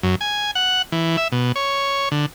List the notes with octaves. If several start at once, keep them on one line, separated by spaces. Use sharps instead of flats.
F#2
G#5
F#5
E3
E5
B2
C#5
D3